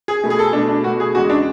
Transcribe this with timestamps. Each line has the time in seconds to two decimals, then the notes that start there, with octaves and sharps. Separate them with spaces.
0.08 G#4
0.24 B2 A3
0.30 G#4
0.39 A4
0.53 B2 A3 D4
0.69 D4
0.84 B2 A3 F#4
1.00 G#4
1.15 E2 C#3 G#3 F#4
1.30 D4